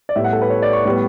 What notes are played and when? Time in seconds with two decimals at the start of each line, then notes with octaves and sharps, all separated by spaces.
0.09 D5
0.16 A2 G3 B3 E5
0.24 F#5
0.33 A4
0.42 B4
0.50 C#5
0.62 D5
0.73 C#6
0.85 A2 G3 B3